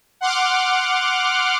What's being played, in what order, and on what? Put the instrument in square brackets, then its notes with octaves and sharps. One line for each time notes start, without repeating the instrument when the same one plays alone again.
[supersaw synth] F#5 C6 D6 F6